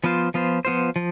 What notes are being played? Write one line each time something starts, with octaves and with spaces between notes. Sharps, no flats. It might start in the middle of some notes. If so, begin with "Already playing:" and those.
F3 B3 F4 C5
F3 B3 F4 C5
F3 B3 F4 C5
F3